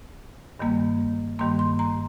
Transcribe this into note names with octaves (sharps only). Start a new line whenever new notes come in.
G2 D#3 G3 A#3
G2 D#3 G3 A#3 C6
C6
A#5